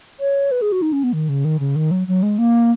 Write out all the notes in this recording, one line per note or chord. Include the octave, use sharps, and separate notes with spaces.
C#5
B4
G#4
F#4
D#4
C#4
B3
D#3
C#3
D#3
C#3
D#3
F#3
F#3
G#3
A#3